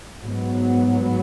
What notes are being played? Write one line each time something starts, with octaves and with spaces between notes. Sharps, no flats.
G#2 F#3 B3